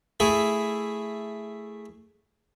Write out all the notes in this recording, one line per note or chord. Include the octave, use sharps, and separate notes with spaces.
A3 E4 G#4